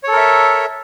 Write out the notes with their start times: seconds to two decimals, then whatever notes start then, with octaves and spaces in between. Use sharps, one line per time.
0.03 C#5
0.08 A4
0.12 A#4
0.17 E5